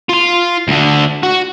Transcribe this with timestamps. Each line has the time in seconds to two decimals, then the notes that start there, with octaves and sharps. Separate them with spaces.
0.09 F4 C6
0.68 D2 D3
1.23 F#4